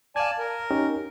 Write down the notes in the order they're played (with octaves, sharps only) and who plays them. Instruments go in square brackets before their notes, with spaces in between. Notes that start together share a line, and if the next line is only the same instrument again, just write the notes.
[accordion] D5 G#5 A5 [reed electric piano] F5 G#6
[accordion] A#4
[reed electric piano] C#4 D#4 G4